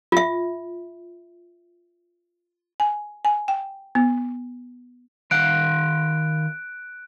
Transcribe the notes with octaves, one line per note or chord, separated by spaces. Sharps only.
F4 E5
G#5
G#5
G5
B3
D#3 F5 F#5 F#6 D7